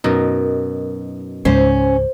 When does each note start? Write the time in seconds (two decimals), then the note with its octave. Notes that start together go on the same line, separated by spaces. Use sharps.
0.04 F#2 B2 D#4 A#4
1.45 C#2 G#2 C#4 C5